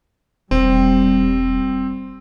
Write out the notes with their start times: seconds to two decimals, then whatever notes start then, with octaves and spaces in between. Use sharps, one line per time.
0.51 E1 G3 C4